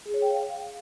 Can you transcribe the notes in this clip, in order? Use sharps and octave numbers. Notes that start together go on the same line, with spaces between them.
G#4
C#5
G5
F5